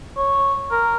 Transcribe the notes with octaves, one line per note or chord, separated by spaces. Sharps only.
C#5
A#4